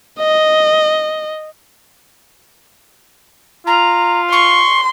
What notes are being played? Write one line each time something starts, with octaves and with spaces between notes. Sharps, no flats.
D#5
F4 A#5
C6 C#6